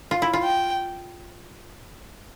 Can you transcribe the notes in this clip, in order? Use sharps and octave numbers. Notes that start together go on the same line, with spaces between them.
F4
E4
F4
G5